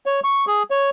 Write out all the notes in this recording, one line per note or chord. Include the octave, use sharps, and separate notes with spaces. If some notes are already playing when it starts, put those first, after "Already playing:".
C#5
C#6
G#4
C#5